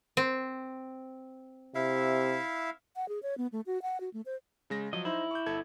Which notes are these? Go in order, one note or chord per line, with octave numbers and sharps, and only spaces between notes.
C4
C3 E4 E5 F5
F#5
G#4
C#5
B3
A3
F#4
F#5
F#4
A3
C5
C#3 G#3 A#6
F3 F#3 D#5
D#4 E4 C5
C#6 D6 G6
G1 A4 G#6